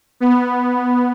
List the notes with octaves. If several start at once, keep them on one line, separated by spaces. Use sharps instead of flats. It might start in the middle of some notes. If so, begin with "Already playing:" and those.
B3